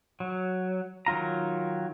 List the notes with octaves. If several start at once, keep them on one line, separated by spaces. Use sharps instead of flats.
F#3
D#3 F#3 F4 A#5